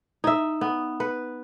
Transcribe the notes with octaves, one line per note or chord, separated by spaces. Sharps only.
D#4 E5
B3
B4